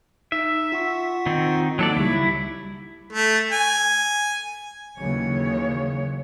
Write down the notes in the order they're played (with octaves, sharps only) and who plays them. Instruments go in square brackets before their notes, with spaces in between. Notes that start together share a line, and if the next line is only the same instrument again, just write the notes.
[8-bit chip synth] D#4 [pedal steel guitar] E5
[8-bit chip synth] F4 F#5 C#6
[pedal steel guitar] D#3 C4 D#4
[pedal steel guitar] F#3 A4 D5 [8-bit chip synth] A#3 D#4
[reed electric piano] C#2 G3 [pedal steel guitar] E4
[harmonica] A3
G#5
[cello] D#2 C#5 [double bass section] C#3 E3 F#3